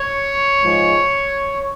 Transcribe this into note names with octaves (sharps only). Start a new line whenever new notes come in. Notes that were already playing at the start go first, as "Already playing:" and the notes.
Already playing: C#5
G#2 F3 G#3